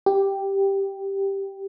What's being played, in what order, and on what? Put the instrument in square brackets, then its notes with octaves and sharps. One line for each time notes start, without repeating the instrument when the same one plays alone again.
[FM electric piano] G4